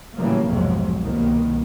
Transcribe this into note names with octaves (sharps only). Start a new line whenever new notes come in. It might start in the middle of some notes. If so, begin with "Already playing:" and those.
A2 C#3 E3 F#3 G3 A#3
B1 F2 G#2 C3 F#3
C2 B2 D#3 A#3